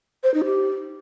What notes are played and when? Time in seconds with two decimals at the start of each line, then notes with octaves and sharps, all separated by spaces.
0.24 C5
0.34 D#4
0.45 G4